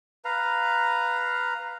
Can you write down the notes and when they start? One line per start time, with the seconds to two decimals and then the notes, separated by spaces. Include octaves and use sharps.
0.25 B4 F5 A#5